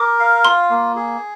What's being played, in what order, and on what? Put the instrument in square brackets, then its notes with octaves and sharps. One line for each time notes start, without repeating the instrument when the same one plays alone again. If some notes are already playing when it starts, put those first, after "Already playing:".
Already playing: [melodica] A#4 [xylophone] D6
[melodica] F5
[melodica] F4 [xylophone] C6
[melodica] A#3
G#4